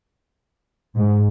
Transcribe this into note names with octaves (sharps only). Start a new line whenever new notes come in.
G#2